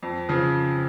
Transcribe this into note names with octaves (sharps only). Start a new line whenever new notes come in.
F2
C#3 F3